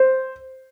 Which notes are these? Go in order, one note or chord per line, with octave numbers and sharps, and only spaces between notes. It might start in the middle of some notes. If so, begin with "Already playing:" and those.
Already playing: C5